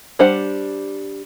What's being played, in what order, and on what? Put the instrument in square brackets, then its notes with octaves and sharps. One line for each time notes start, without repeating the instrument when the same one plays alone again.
[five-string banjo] G3 D4 C5 F#5